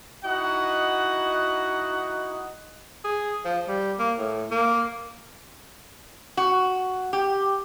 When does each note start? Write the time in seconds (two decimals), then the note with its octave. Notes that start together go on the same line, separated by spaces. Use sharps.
0.25 D#4 E4 F#4 D#5 F#5
3.04 G#4
3.45 F3
3.68 G3
3.99 A#3
4.18 A2
4.51 A#3
6.37 F#4
7.13 G4